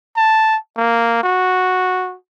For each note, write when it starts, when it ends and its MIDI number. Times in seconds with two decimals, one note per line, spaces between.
0.17 0.57 81
0.77 1.19 58
1.23 2.15 66